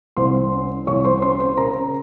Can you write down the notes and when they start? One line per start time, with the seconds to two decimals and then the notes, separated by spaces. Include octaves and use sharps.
0.17 C2 C5 C6
0.53 C#4
0.87 C2 C#5 C#6
1.05 C5 C6
1.22 C#4 C5 C6
1.40 C5 C6
1.57 C#3 A#4 A#5